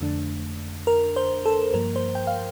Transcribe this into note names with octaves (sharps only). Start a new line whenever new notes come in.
F2 D3 A3 D4
A#4
C5
A4
G2 F3 A#3 A#4
C5
G5
F5